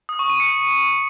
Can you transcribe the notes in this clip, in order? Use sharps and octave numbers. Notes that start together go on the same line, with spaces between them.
D#6
C#6
D#7
C#7